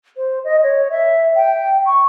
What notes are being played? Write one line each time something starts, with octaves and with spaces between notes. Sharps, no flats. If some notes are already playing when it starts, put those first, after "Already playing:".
C5
D#5
C#5
E5
G5
C#6